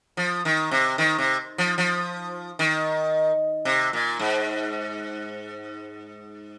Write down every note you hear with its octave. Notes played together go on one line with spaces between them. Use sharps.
F3
D#3
C3
D#3
C3
F3
F3
D#3
C3
A#2
G#2